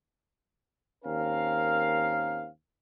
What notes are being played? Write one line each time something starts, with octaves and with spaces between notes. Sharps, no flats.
D#2 C4 C#4 A#4 F5